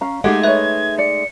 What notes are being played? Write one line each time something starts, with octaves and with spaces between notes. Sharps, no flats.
C#4 F5 A#5
G#3 A3 D#4 G4 A4 F5 F#5 G#6
B4 C#5 E5
D5 C#7